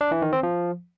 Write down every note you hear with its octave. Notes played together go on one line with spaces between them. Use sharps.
D4
E3
D#3
C4
F3